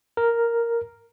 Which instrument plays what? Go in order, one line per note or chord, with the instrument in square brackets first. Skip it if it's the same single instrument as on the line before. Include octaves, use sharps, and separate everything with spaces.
[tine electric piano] A#4